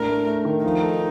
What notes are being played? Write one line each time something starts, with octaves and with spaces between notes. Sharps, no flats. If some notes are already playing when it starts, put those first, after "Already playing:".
Already playing: A2 D4 A#4
A3
A3
D#3
F3 D#4
A4